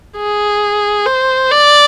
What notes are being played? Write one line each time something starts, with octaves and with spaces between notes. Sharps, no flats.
G#4
C5
D5